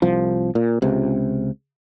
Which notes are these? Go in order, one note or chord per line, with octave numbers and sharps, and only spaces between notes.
C2 F3
A#2
C#2 C3